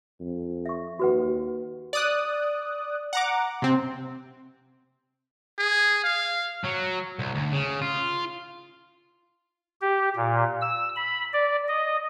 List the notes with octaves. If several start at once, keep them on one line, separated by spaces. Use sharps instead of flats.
F2
E5 C#6
D#2 F#4 B4 F#5
D5 D#6 F#6
F#5 A#5 D6
C3 C4
G#4
F5
F#3
C2
D2
C#3
F4
G4
A#2
E6
B5
D5
D#5